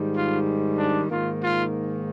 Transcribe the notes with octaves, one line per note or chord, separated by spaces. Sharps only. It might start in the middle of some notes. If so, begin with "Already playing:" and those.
Already playing: G#2 D#3 G3
F4
D4
G#2 D#3 A#3 F4
F4